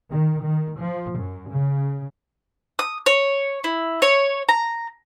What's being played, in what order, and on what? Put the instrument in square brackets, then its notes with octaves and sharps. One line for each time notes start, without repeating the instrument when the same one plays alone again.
[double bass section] D#3
D#3
F3
F#2
C#3
[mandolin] D#6
C#5
E4
C#5
A#5